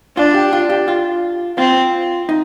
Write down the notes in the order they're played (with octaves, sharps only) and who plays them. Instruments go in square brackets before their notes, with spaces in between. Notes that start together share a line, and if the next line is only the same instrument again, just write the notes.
[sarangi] D4 [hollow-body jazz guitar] F4
[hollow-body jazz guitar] G4
F4
G4
F4
[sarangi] C4 [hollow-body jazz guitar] F4
[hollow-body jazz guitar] D#4